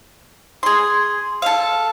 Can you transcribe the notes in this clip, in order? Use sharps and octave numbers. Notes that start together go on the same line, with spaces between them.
G#4 C6
A4 F5